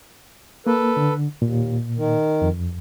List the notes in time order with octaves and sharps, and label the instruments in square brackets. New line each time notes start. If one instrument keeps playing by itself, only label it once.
[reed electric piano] A#3 [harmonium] A4 B4
[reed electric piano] D3
[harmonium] D#2 [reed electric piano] A#2
[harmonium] D#3
[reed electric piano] F2